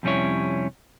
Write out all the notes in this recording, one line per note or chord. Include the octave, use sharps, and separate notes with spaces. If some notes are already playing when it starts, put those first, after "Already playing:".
F2 C3 G3 C#4 E4 C#5